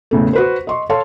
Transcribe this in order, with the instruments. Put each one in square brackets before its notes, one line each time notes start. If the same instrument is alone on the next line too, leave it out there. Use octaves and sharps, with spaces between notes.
[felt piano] E2 A2 C#3 A3
F#4 B4 C5
D#5 C6 C#6
A4 C#5 F5 A5 C6